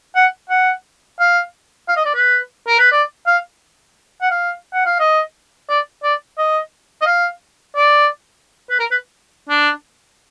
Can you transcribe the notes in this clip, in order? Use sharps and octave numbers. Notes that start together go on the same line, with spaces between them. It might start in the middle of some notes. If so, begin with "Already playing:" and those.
F#5
F#5
F5
F5
D#5
D5
B4
A#4
B4
D5
F5
F#5
F5
F#5
F5
D#5
D5
D5
D#5
D#5
F5
D5
B4
A#4
B4
D4